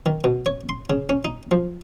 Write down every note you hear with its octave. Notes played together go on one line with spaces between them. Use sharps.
D#3
B2
C#5
C6
C#3
C#4
D#4
F3